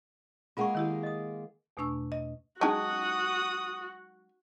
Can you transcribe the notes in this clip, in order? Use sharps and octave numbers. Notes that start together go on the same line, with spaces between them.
G#3 A#3 C#4 F4 G#4 F#5 C#6
D#3 E4 G4
D#5 D#6
E2 B2 A3 D4 C#6 E6
D#5
F#3 G#3 C#4 D#4 F#4 A5 D#6